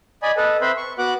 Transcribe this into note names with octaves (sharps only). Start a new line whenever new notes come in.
D5 D#5 G#5 B5
A4 B4 D#5
C4 B4 C5 E5 B5
C#6
B3 F#4 F#5 D6 F#6